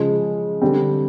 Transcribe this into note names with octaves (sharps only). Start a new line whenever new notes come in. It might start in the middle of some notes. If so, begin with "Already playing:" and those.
Already playing: C#3 F3 G#3
D3 G3 C4